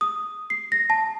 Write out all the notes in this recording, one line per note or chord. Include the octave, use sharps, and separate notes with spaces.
D#6
C7
A#6
A5